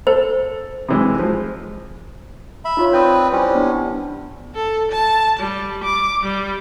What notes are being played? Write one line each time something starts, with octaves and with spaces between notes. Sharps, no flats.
A4 C5
C3 E3 G#3
F3 G#3
E5 B5
D#4 F4 C#5
C4 B4 D5 D#6 G6
G3 C#4 E4 C5
B3 D4
A4
A5
G3
D6
G3